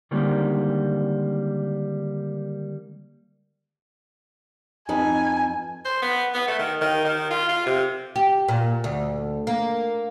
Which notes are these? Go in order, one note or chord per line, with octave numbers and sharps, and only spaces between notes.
D3 D#3 G3 G#3 A#3 C4
F2 D#4 B4 G#5
C5
B3
B3
A3
D#3
D#3
D#3
F4
F4
C3
G4
A#2
D2
A#3